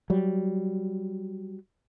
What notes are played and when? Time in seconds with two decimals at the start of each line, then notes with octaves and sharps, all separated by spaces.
0.10 F#3 G3